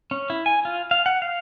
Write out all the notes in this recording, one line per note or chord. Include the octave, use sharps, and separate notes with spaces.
C#4
E4
G#5
F4
F5
F#5
F5